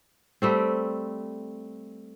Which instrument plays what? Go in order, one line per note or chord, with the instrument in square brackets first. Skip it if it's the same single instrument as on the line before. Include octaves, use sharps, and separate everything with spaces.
[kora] G3 A3 C4